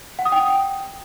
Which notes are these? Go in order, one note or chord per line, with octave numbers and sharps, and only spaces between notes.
F#5
D#6
G5